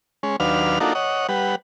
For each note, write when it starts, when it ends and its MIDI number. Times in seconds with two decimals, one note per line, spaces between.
0.23 0.36 56
0.23 0.36 61
0.40 0.79 39
0.40 0.79 54
0.40 0.79 62
0.40 0.79 71
0.40 0.79 77
0.40 0.79 89
0.80 0.93 58
0.80 0.93 62
0.80 0.93 63
0.80 0.93 65
0.80 0.93 66
0.80 0.93 69
0.95 1.27 73
0.95 1.27 75
0.95 1.27 78
1.29 1.55 55
1.29 1.55 71
1.29 1.55 78